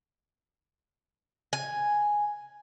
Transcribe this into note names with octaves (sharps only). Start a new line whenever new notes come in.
G#5